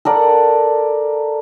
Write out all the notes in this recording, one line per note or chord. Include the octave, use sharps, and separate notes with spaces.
A4 A#4 D5 F#5